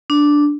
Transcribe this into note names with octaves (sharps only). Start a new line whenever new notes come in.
D4